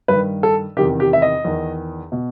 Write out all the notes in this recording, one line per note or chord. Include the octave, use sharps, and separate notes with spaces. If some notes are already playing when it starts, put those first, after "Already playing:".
G2 D#3 B4
A4
E2 C3 D#3 G4
G4
E5
D#5
E2 D#3
B2